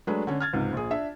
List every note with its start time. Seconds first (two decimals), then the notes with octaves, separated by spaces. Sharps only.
0.07 F#3 G#3 A3 D4 B4
0.27 D3 C#4
0.40 F6 G#6 A6
0.53 C#2 G#2 C3
0.73 A#1 G#4
0.91 D4 E5